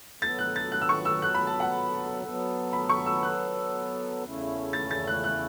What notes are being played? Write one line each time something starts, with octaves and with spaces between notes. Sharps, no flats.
F#3 B3 A4 A6
F#6
A6
F#6
E6
C#6
E6
F#6
B5
A5
F#5
F#3 B3 A4
B5
C#6
E6
F#6
E2 C#3 A3 C#4 E4
A6
A6
F#6
F#6